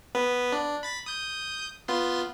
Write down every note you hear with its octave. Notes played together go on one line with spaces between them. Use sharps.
B3 B4
D4
B5 A6 B6
D#6 G6
B3 F4 C6